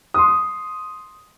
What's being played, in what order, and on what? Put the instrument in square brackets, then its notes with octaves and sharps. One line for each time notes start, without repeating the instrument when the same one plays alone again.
[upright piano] C6 D#6